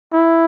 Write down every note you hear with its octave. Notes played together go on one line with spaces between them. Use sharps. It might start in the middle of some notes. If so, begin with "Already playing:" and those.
E4